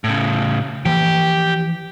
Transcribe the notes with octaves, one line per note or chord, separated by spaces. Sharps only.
A2 C#3
E3 F3 A#3 G4